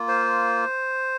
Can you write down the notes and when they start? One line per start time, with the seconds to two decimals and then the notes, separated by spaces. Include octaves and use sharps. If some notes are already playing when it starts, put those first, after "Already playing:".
Already playing: A#3 F4
0.08 C5